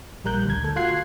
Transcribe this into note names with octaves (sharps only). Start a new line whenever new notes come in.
A#1 G3 A#4 F#6 G6
D2 G#6
A4
F4 F#4 F#6 G#6 C7